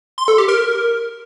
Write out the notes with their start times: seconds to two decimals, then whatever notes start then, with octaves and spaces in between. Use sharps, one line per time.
0.18 C6
0.28 A4
0.38 G4
0.48 A#4